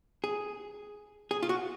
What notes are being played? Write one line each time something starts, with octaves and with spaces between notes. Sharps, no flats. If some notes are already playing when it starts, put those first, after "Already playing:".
G#4
G#4
F4
F#4